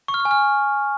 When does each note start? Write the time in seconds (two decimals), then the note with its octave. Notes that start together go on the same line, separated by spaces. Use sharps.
0.08 C#6
0.14 F6
0.20 C#6
0.25 G#5
0.31 F6